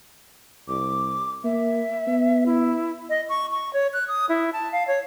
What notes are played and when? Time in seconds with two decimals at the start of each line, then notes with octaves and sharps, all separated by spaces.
0.68 C2 D6
1.44 A#3 E5
2.07 B3
2.46 E4
3.10 D#5
3.29 C#6
3.51 C#6
3.73 C#5
3.93 F#6
4.08 D#6
4.29 E4
4.53 A5
4.72 F5
4.88 C#5